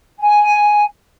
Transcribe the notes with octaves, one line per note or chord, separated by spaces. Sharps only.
G#5